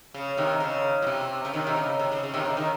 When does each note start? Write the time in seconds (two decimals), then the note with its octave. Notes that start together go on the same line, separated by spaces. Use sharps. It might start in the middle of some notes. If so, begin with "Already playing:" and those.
0.14 C#3
0.37 C3 D#3
0.60 C#3
1.02 A#2
1.07 C3
1.45 C#3
1.53 C3 D#3
1.67 C3
1.76 C#3
1.99 C3
2.12 C#3
2.23 C#3
2.34 C3 D#3
2.45 C#3
2.57 D#3